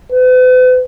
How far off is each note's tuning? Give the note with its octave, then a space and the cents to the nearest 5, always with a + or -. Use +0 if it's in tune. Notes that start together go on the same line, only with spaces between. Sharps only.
B4 +45